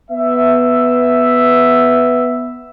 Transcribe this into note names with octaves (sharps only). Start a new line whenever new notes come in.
B3 E5